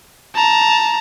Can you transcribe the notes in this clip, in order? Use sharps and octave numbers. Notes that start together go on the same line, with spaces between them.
A5 A#5